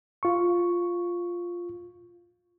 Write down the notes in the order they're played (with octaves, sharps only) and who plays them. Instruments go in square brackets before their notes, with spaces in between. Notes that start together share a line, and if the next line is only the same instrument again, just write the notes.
[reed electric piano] F4 C#6